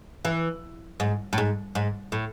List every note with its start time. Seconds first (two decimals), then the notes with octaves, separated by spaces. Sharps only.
0.25 E3
1.00 G#2
1.33 A2
1.38 G#2
1.75 G#2
2.12 A2